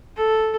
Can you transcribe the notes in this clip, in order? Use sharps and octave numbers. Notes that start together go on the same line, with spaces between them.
A4